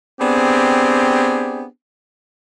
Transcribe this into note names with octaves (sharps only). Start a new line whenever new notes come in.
B3 C4 D4 G4 G#4